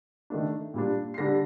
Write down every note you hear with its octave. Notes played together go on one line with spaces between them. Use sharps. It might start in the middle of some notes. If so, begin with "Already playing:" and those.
D#3 A3 D4
A#2 G3 D4
C7
D3 G3 D4 A#6